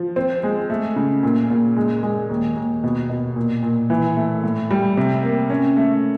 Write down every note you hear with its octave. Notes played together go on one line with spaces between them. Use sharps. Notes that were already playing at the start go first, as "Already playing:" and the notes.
Already playing: F3
C4
G#3
A3
C#3
A#2
A#2
G#3
G#3
D#2
D#2
B2
B2
A#2
A#2
E3
A3
A2
G3
C3
A#3
C#4
A3